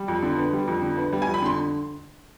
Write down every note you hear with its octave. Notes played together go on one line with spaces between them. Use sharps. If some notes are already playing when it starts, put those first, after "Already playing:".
Already playing: G3
F2
D3
B3
G3
F2
D3
B3
G3
G#5
F2
B5
D3 C6